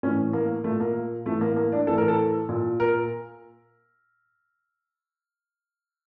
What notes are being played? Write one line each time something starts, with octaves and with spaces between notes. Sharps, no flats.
A2 E3 C#4
A#3
A#2 A3
A#3
A2 E3 A3
A#3
A#3
D4
A2 E3 A4
A#4
A4
A#2
A#4